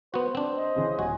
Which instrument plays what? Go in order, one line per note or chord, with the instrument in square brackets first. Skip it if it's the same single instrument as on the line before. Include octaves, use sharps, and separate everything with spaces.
[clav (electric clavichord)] B3 F#4 [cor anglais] C5
[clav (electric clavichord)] C4 D4
[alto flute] D#5
[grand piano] C#3 E3 C#4
[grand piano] D#1 [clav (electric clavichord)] F#4 [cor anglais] G#5